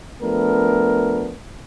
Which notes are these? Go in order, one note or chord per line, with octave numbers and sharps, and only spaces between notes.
F3 A3 B3 D4 A#4